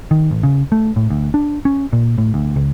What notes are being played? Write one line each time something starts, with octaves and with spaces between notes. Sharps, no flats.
D#3
A1
C#3
A3
A2
D2
D4
C#4
A#2
A2
D2
C#2